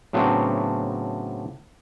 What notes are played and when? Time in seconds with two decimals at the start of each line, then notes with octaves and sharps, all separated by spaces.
0.13 A2 C#3 F#3 B3 C4 D4